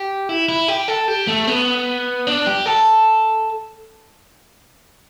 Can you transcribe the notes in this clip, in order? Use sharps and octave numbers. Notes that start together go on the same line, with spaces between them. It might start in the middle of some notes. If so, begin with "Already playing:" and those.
Already playing: G4
E4
E4
G4
A4
G4
A3
B3
D4
G4
A4